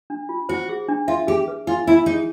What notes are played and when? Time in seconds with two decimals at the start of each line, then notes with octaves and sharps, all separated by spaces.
0.10 D4
0.29 F4
0.49 F#4 C5
0.69 G#4
0.89 D4
1.08 F4 E5
1.27 G4 G#4
1.48 B4
1.67 F4 G#5
1.87 E4 E5
2.06 D#4 G#4